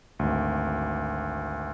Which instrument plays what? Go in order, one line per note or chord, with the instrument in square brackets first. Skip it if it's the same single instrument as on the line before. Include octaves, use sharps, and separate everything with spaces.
[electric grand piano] G#1 D2